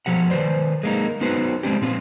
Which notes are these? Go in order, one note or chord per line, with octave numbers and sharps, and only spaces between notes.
B2 F3 G4 F#5
D#3 B4 C5 D5
G#3 A#3 D#4
B3 D#4 F#4 B4 C5
G#3 C4 D4 G4
A#2 C4 F4